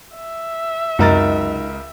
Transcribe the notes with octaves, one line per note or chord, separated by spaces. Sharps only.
E5
C#2 F#2 C3 D#4 F#4 A#4 D#5 A6